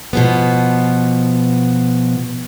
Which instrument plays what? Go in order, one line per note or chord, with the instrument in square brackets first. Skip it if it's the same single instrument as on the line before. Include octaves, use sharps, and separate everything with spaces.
[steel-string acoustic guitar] B2 F3 B3